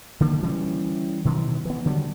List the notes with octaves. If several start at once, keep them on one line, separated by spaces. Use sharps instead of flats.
D3 D#3 A#3
E3 G3 A3 C#4
B2 D#3 E3 F#3
E3 B3
D3 D#3 F#3 G3